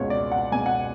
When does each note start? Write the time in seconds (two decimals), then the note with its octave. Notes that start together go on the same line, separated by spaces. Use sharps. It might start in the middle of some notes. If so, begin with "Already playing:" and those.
Already playing: C#2 B2 C#5
0.10 D5
0.32 F#5
0.52 C#2 B2 G#5
0.66 F#5